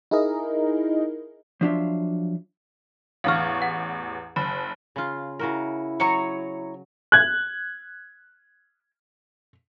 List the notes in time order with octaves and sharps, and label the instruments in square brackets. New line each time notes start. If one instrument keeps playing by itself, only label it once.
[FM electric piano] D#4 E4 G#4 A#4 D#5
[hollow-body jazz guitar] F3 F#3 D4 E4 F4 E5
[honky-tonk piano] A1 E2 C#6 [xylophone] F5 F6
[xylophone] F#5
[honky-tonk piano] F#1 [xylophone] B5
[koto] C#3 F4
[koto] C#3 F#4 A#4 [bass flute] E4
[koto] F#3 [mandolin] C#5 A#5 C#6
[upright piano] F#6 G#6